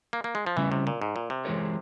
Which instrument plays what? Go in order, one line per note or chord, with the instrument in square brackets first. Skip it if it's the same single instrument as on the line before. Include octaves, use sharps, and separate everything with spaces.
[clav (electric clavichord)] A#3
A#3
G#3
F3
[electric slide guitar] C#3 G3 C#4 E4 [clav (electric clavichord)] E3
[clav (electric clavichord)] C3
A#2
G#2
A#2
C3
[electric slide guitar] E3 G#3 E4 A#4 C#5